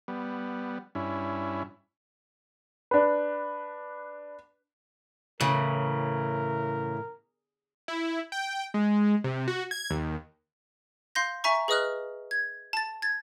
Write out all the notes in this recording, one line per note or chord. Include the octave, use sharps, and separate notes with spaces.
G3 B3
G2 C#4 E4
D4 B4
A2 C#3 E3 A#4
E4
G5
G#3
C3
F#4
G#6
D#2
F5 C6 G6 A#6
E5 G#5 A#5 C#6
G#4 B4 D#5 D#6 F6 F#6
G#6
A5 A6
G#6 A6